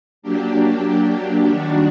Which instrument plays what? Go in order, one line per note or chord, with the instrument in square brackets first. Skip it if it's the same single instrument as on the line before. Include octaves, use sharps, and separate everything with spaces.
[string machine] F#3 A#3 D4 G4
D#3 G3 D4 F#4